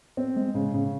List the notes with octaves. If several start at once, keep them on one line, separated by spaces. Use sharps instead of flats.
C4
G#3
C#3
C#3